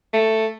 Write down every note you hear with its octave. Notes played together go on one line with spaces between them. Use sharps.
A3